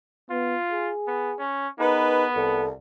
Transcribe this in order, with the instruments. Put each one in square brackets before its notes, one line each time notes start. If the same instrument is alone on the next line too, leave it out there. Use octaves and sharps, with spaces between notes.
[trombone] B3 [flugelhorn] F4
[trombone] G#4
[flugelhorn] B3
C#4
[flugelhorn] B3 [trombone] D#4 [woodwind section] G#4 A#4 B4
[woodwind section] C2 [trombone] A4